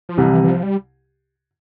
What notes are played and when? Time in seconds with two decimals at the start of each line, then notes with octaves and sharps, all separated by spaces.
0.09 F3
0.18 C2 C3 E3 G3
0.33 E3
0.44 E3
0.48 F3
0.63 G3